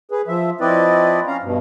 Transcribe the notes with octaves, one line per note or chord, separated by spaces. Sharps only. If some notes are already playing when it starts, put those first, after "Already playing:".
G#4 B4
F3 E5
F3 C4 E4 B4 D5 D#5
C#4 F5 A#5
G2 B2